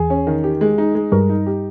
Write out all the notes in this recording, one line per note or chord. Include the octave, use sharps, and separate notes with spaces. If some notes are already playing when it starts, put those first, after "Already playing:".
Already playing: E2 E3 G#4
C#4
D#3
G4
G#3
D#4
G#3
G2 G3 A#4
D#4
G4